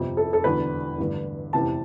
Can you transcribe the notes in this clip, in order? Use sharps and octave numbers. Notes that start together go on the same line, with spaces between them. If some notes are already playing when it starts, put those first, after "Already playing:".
Already playing: G1 F2 C3
A4
A4
E1 E2 D3 B4
A1 G2 D3
F1 E2 C3 E3 A5